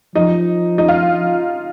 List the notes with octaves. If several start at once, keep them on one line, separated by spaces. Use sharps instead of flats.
F3 D#4
D#4
F4